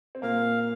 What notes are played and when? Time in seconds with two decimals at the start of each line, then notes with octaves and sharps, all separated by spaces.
0.15 C4
0.22 A#2 A#3 F5